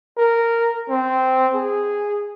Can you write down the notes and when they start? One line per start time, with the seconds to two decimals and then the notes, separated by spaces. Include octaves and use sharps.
0.17 A#4
0.89 C4
1.55 G#4